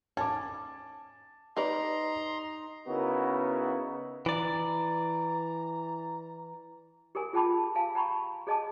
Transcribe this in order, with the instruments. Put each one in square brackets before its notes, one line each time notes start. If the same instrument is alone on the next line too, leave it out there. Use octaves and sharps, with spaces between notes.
[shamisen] C#4 [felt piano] A5 D6
[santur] D#4 [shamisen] G4 B4 D5 [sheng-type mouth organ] A#5 C6
[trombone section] C#3 B3 D#4 E4 F#4 A#4
[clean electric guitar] E3 D5 [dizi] A#5
[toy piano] G4 A4 A#4 G#5
F4 G#4 G5 A5 B5 D6
F5 G#5 A5
G5 A#5 B5 C#6
G#4 A4 D#5 G#5 A5 D6